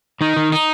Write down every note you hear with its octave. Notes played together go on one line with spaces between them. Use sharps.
D#3 D#4
D#3
D#4